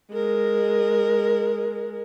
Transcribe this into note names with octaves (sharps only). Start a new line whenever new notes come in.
G#3 A#4